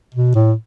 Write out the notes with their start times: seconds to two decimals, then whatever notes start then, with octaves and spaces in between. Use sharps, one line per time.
0.15 B2
0.35 A2